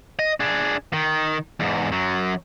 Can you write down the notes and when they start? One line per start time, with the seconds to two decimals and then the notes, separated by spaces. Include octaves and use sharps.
0.19 D#5
0.40 D4 G#4
0.93 D#3
1.60 E2 G#2
1.92 F#2 F#3